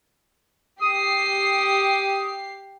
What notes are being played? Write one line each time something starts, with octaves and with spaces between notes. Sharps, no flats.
G4 D#6 C7